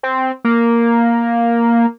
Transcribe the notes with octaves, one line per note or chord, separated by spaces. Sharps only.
C4
A#3